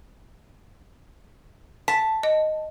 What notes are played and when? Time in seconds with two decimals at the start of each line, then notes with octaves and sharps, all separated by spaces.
1.88 A5 B6
2.23 D#5